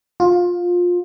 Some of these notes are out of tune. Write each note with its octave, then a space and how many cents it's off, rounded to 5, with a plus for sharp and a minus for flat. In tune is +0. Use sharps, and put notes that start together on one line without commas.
F4 +20